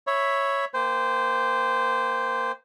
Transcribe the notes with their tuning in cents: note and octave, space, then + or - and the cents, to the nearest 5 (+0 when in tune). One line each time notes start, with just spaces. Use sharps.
C#5 +0 E5 +0 B5 +5
A#3 +0 C5 -15 G5 +25